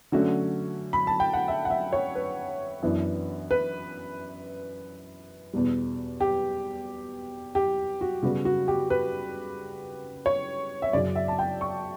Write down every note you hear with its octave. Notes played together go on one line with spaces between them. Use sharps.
D3 F#3 A3 C#4 F#4
B5
A5
G5
F#5
E5
F#5
E5
C#5
B4
F#2 E3 B3 D4
B4
E2 B2 G3
G4
G4
F#4
C#3 G3 B3 F#4
F#4
G4
B4
C#5
E5
F#2 C#3 F#3 C#4 D5
E5
A5
G5
C#6